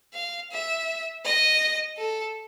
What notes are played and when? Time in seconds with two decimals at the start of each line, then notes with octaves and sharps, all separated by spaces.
0.14 F5
0.51 E5
1.25 D#5
1.98 A4